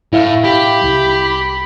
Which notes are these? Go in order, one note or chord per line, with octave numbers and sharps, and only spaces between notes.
A2 E4 E5 F5
G4 B5
C2